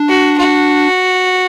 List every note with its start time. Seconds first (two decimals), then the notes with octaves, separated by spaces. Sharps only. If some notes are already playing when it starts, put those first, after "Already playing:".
Already playing: D4
0.08 F#4
0.38 F#4